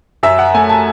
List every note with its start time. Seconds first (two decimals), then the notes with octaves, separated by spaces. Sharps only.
0.23 F#2 E5
0.39 F#5
0.54 A3 G#5
0.69 A5